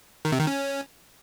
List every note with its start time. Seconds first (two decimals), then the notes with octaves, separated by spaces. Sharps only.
0.25 D#3
0.32 C3
0.40 D#3
0.47 C#4